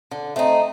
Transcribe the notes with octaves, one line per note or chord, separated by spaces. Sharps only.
D3
A3 C4 D#4